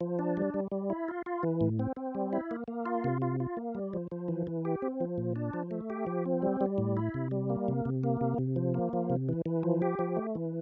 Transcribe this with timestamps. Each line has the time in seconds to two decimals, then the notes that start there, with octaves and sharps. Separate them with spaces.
0.01 F3
0.19 D4
0.37 G3
0.54 G3
0.72 G3
0.90 E4
1.08 F4
1.26 F4
1.43 E3
1.61 A2
1.79 C4
1.96 C4
2.15 G3
2.33 E4
2.51 A#3
2.68 A#3
2.86 F4
3.04 C3
3.22 F4
3.40 F4
3.57 A#3
3.75 G3
3.93 F3
4.12 F3
4.28 E3
4.47 E3
4.65 G4
4.82 C4
5.00 F3
5.18 A#2
5.36 D4
5.53 F3
5.71 A3
5.90 G4
6.07 F3
6.26 C4
6.42 G3
6.61 G3
6.78 A2
6.97 E4
7.14 C3
7.31 G3
7.50 A#3
7.68 C3
7.85 C3
8.04 A#3
8.21 C3
8.38 C3
8.56 F3
8.74 A#3
8.93 F3
9.10 C3
9.29 E3
9.46 E3
9.63 F3
9.82 G4
9.99 F3
10.17 A3
10.35 E3